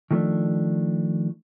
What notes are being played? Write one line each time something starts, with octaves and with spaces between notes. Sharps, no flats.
D#3 F3 A3 C#4 D4